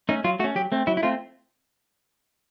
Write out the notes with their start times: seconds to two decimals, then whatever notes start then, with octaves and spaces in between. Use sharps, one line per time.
0.09 A3 C#4 D#4
0.24 F#3 F4
0.39 A3 F#4
0.44 C#4
0.55 F#3 G4
0.72 A3 C4
0.87 F#3 E4
0.97 E4
1.03 A3 C4 F4